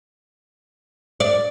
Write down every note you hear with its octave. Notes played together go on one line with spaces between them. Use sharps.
D5